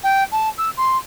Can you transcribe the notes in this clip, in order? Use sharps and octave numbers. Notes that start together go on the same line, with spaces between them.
G5
A5
E6
C6